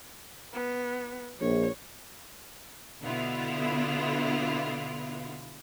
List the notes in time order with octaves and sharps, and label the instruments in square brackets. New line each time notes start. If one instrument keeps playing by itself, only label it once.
[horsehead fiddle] B3
[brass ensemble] A#1 [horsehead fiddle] C#5
[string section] B2 D3 B3 E4 F4